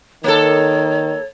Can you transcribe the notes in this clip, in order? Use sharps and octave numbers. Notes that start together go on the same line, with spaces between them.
D#3 A#3 A4 C#5